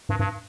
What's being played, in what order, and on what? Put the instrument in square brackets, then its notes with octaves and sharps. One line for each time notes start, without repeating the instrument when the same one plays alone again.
[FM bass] G2
G2